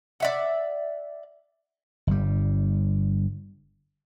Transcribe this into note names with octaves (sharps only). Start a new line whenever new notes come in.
D5 E5 F#5
G1 G3